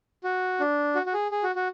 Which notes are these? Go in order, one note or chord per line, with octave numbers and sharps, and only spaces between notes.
F#4
D4
F#4
F#4
G#4
G#4
F#4
F#4